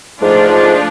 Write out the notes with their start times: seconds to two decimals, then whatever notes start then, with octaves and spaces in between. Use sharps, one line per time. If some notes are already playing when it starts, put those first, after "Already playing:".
0.21 G#2 F3 A3 D4 F4
0.49 G#2